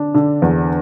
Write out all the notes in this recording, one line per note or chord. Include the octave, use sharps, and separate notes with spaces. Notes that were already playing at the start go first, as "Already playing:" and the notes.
Already playing: D3 D4
D3
E2